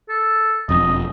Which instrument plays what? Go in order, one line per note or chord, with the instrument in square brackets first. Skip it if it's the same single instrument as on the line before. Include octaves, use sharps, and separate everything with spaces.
[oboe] A4
[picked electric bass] E1 F2 [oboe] D#5